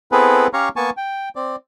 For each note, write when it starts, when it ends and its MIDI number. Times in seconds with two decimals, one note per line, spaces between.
0.12 0.47 59
0.12 0.47 60
0.12 0.47 64
0.12 0.47 68
0.12 0.47 69
0.12 0.47 71
0.53 0.69 61
0.53 0.69 67
0.53 0.69 73
0.53 0.69 77
0.53 0.69 82
0.53 0.69 85
0.76 0.90 58
0.76 0.90 59
0.76 0.90 80
0.76 0.90 81
0.76 0.90 85
0.97 1.29 79
1.36 1.56 60
1.36 1.56 74